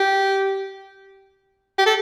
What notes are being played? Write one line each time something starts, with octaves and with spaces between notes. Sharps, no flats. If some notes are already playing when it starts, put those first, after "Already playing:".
Already playing: G4
G4
A4